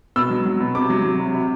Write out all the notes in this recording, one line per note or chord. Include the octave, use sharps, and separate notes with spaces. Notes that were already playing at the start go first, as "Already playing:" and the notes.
B2 E6
F#3
F#3
B2
C3 D6
F#3
F#3
C3
C3